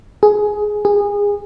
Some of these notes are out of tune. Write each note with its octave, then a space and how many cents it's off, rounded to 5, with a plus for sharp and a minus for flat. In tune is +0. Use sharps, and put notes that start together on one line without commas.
G#4 +10
G#4 -25